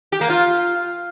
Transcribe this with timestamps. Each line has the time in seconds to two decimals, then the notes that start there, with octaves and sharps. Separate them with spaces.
0.12 G4
0.21 A#3
0.30 F4